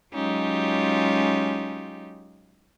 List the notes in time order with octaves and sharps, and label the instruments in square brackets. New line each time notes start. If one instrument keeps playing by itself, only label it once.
[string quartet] F#3 G#3 C#4 D#4 F4 G4